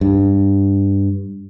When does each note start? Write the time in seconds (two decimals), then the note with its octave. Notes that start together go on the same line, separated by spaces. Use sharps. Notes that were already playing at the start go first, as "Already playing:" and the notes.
0.01 G2